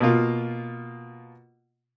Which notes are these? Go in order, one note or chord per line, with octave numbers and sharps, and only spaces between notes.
B2 A#3 F4